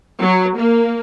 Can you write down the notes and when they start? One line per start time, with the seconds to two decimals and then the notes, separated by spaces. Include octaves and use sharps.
0.19 F#3
0.56 A#3